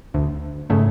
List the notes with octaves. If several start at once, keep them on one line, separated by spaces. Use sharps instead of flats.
D2
G#2 C#3 A3